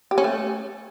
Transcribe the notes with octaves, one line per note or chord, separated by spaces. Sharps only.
G4
C#4
A3